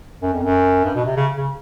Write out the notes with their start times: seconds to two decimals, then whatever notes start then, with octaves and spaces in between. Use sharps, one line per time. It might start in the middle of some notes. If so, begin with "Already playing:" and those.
0.22 F#2
0.33 F2
0.42 F#2
0.84 G2
0.95 B2
1.06 C3
1.16 C#3
1.37 C#3